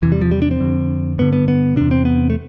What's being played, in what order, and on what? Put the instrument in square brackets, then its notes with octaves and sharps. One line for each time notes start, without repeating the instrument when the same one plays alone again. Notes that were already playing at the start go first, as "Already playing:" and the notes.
[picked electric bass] E2 C3 E3
G3
F3
G3
D4
C4
F2 D3
G2 D3 B3
B3
B3
E2 C3 D4
C4
B3
A3